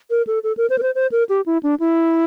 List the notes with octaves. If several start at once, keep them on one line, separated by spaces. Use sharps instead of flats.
A#4
A4
A4
A#4
C5
A#4
C5
C5
A#4
G4
E4
D4
E4